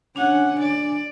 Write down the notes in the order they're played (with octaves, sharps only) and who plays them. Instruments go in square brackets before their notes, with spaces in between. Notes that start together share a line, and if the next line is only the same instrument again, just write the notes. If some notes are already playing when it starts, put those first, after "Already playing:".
[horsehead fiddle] C#4 F#5 [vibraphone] D4 G#5
[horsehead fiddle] D5